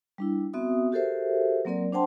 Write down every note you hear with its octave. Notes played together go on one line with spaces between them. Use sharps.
G3 D4 E4
B3 C4 F#4 E5 D#6
F#4 G4 A4 A#4 C5 E5
F#3 A#3 C4 A#4 D5
D4 C5 F#5 G5 A5 C6